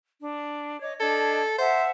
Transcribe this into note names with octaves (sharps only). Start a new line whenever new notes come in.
D4
C#5 D#5 D6
D4 A4 D#5 G#6
C5 E5 F#5 A5